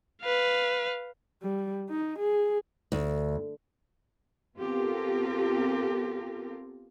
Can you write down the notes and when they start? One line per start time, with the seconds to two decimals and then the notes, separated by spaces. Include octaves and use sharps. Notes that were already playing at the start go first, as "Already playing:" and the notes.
0.23 B4 F5
1.43 G3
1.90 D#4
2.19 G#4
2.92 D2
4.58 B3 C4 F4 G4 A4 A#4